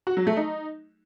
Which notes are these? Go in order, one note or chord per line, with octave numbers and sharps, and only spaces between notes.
F#4
F#3
A3
D#4